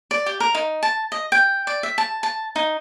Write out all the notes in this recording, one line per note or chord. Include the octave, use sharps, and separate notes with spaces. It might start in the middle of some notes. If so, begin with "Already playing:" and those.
D5
G4
A#4
D#4
A5
D#5
G5
D5
E5
A5
A5
D#4